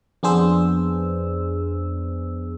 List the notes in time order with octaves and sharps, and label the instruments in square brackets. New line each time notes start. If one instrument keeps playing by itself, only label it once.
[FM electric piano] F2 B3 D4 G#4 C5 E6